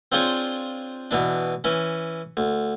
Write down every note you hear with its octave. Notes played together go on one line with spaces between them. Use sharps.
C4 D4 F4 G#4 C5 C#5
B2 E3 D4
E3 C#4
D2